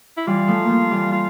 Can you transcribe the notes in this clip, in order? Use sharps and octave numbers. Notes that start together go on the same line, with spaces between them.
E4
E3 G3 F4
F3 A3
F3 A3 A#3
E3 G3
F4